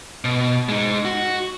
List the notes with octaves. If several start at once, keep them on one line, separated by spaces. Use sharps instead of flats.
B2
G#3 D#4
F#4